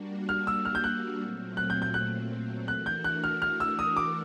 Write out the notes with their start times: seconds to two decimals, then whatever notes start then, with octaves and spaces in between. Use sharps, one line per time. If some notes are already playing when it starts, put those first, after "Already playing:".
Already playing: G3 A#3 D4 F#4
0.29 F6
0.47 E6
0.65 F6
0.75 G6
0.84 F#6
1.21 A#2 F#3 A3 C4
1.57 F#6
1.70 G6
1.82 G6
1.94 F#6
2.68 E3 A3 D4 F#4 A#4 F#6
2.86 G6
3.04 F#6
3.24 F6
3.42 F6
3.60 E6
3.79 D#6
3.97 D6